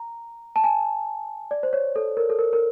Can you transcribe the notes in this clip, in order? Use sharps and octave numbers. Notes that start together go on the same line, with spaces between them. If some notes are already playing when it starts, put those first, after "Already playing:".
Already playing: A#5
A5
G#5
D5
C5
C#5
A4
A#4
A4
A#4
A#4